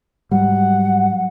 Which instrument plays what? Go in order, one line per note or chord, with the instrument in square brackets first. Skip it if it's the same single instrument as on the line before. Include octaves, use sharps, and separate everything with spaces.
[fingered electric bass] G#2 F#3 G3 [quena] F#5